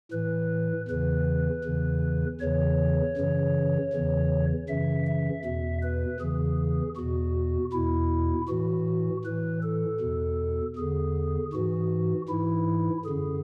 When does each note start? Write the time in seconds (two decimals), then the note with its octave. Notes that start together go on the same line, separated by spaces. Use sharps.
0.12 A2 E3 B4
0.88 E2 C#3 E3 B4
1.64 E2 C#3 E3
2.40 E2 C#3 E3 C#5
3.17 F#2 C#3 E3
3.92 E2 C#3 E3
4.69 F#2 C#3 E3 E5
5.07 E5
5.44 E2 B2 E5
5.82 B4
6.20 E2 C#3 E3 G#4
6.97 E2 B2 F#4
7.72 E2 B2 E4
8.49 A2 E3 F#4
9.24 A2 E3 B4
9.63 A4
10.00 E2 B2
10.76 E2 D3 G#4
11.53 G#2 E3 F#4
12.29 G#2 E3 E4
13.05 F#2 D3 G#4